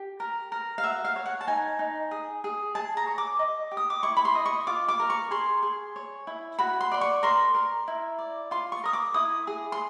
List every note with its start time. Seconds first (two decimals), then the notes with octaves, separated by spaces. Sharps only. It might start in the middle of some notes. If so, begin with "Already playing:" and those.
Already playing: G4
0.20 A#4
0.52 A#4
0.78 F5
0.84 F#4 E5
1.05 F5
1.16 C#5
1.26 F#5
1.41 A5
1.47 D#4 G#5
1.79 D#4
2.11 G#4
2.44 G#4
2.75 G#4 A5
2.97 A#5
3.07 C#5
3.18 D6
3.39 D#5
3.71 G4
3.77 D#6
3.90 D6
4.03 E4 C#6
4.17 B5
4.25 C6
4.35 D#5
4.46 C#6
4.67 F4 D6
4.88 D6
5.00 A#4
5.10 C#6
5.31 G#4 C6
5.63 G#4
5.96 C#5
6.27 E4
6.59 F#4 B5
6.81 C6
6.92 D5 C6
7.01 C#6
7.23 A#4 C6
7.54 A#4
7.88 E4
8.18 D5
8.51 F4 C6
8.72 C#6
8.84 A#4 D#6
8.93 D6
9.14 E4 D#6
9.47 G#4
9.72 C6